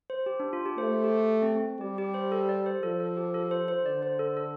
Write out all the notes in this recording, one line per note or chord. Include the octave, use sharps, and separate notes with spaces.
C5
G4
D4
F4
G4
A3 C5
G4
C4
C4
G3 G4
G4
C5
A4
D5
C5
F3 A4
A4
G4
A4
C5
C5
D3 D5
C5
A4
A4